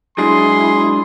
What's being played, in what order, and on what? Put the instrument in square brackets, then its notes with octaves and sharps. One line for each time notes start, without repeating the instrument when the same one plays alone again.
[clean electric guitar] F#3 G#3 D4 [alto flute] E4 [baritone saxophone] G#4 [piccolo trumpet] C6